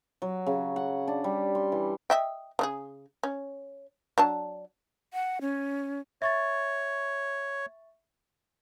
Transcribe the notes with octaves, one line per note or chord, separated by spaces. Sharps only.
F#3
C#3
F#5
D4
G3
C6
E3
D#5 E5 G5
C#3 C4 G#4
C#4
F#3 D4 A5
F#5
C#4
C#5 E5 C#6 A6